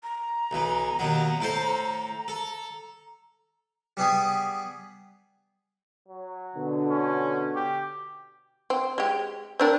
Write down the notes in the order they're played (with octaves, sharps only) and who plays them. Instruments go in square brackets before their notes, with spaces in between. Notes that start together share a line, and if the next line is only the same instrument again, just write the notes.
[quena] A#5
[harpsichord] B1 E3
D#2 B2 F#3
A2 A4 C5
A4
G3 B3 G#4
[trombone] F#3
[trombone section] B2 D3
[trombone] C#4
G4
[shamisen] C4
G#3 G4
C4 D4 A#4